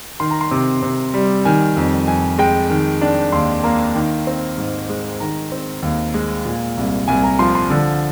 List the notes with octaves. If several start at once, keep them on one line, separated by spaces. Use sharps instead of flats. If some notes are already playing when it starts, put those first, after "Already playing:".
D#3 C6
A#5
C6
C3
C3
G3
D#3 G#5
F2
F2 G#5
G#3 G5
D#3
D4
D#2 C6
A#3 A#5
D#3
C4
G#2
G#3
D#3 A#5
C4
D#2
G#3
A#2
C2
C2 G#5
A#5
F3 C6
C6
D3